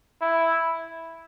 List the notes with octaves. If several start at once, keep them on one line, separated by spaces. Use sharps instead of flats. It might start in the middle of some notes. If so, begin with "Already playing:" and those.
E4